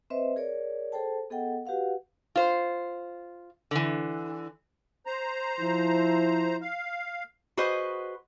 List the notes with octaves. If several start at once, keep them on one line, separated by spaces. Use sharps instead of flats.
C4 B4 C5 D#5 E5
G#4 A#4 C#5 D5
G#4 A4 C5 G5 A5
B3 G#4 A4 D#5 F#5 G5
F#4 G4 B4 F5 F#5
F4 C5
D3 E3
C5 A#5
F3 E4
F5
F#4 G#4 B4 C5 D#5